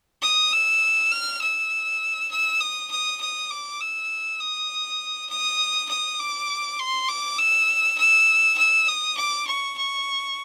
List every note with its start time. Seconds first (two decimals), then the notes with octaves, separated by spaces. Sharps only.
0.22 D#6
0.52 E6
1.12 F6
1.41 E6
2.31 E6
2.60 D#6
2.91 D#6
3.21 D#6
3.50 D6
3.80 E6
4.41 D#6
5.30 D#6
5.89 D#6
6.19 D6
6.79 C6
7.09 D6
7.38 E6
7.98 E6
8.57 E6
8.88 D#6
9.17 D6
9.47 C#6
9.78 C#6